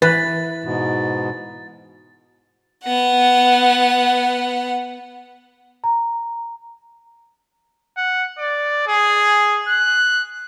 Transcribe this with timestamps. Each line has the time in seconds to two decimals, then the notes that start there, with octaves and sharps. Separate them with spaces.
0.02 E3 B4 A6
0.64 G#2 B2
2.84 B3 F#5
5.84 A#5
7.97 F#5
8.38 D5
8.87 G#4
9.68 F#6